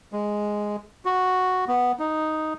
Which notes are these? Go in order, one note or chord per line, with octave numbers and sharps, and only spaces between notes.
G#3
F#4
B3
D#4